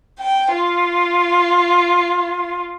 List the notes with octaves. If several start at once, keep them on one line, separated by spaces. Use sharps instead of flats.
G5
F4